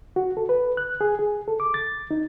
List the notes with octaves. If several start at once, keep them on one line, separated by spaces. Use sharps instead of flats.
F#4
A4
B4
F#6
G#4
G#4
A4
D6
A6
D#4